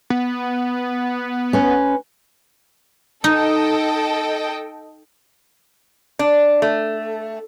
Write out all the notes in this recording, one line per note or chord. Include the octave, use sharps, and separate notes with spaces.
B3
C#4 B4
D#4 A4 D#5 G5
D4
A3